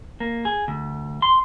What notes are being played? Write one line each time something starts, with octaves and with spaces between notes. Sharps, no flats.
A#3
G#4
D2
C6